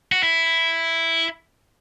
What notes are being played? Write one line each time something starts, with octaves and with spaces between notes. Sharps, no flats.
F#4
E4